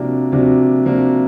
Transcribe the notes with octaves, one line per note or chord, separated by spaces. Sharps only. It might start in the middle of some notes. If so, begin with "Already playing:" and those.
Already playing: C3 F3 A#3 D4 F#4
C3 F3 A#3 D4 F#4
C3 F3 A#3 D4 F#4